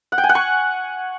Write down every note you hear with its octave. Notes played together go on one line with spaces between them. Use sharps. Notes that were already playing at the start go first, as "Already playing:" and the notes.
F#5
G5
G#5
F#5
C#6